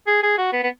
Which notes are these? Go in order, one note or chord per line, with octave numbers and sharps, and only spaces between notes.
G#4
G#4
F#4
B3
B3